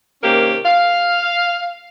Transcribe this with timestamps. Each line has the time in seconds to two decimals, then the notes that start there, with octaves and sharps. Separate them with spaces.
0.23 C3 D#3 A#3 C#4 G4 A#4
0.65 F5